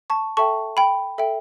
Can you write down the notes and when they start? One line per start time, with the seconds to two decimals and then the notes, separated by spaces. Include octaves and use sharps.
0.10 A5 C#6
0.37 A4 E5 G5 A5 C#6
0.77 G5 B5
1.18 A4 E5 G5